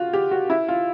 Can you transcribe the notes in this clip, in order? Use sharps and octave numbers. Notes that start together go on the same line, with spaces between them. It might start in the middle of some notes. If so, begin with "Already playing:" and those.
Already playing: F4 F#4
G4
F#4
E4
F4